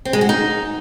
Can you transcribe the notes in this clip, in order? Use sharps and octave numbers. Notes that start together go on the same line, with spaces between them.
C4
G#3
F#4
D#4